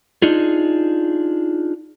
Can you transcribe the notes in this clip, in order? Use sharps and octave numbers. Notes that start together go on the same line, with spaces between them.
D4 D#4 F4 G#4